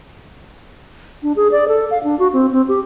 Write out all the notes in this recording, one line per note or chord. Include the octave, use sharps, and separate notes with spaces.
D4
G#4
D5
A4
F5
D4
F#4
C4
C4
G4